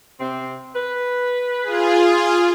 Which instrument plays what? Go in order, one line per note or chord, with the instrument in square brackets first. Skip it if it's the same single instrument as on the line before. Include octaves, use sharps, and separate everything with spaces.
[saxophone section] C3 C4
B4
[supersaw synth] F4 G#4